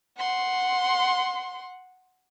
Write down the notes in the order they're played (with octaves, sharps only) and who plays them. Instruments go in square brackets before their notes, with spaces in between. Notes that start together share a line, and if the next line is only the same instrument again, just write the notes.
[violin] F#5 C6